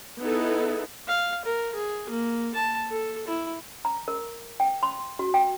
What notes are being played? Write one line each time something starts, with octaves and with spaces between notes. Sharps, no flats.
B3 D#4 E4 G#4 A4
F5
A#4
G#4
A#3
A5
A4
E4
A#5
A#4
G5
C6
F#4
G5